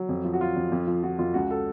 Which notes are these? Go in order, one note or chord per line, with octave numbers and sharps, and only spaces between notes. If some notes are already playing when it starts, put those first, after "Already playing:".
Already playing: F#3
F2
F3
F#4
F3 F4
F2
F2
F3
F3 F#4
F2 F4
C#2 F#4
A4